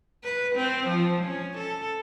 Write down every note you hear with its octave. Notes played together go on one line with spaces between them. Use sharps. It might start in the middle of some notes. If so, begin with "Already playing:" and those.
B4
C4
F3
C#4
A4